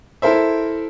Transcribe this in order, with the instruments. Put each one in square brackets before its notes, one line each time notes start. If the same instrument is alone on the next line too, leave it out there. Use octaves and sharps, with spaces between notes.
[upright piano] E4 A4 A#4 C5 E5